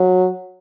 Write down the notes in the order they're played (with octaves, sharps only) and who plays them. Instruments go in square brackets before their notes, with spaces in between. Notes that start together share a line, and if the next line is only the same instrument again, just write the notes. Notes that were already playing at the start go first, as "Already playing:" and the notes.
Already playing: [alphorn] F#3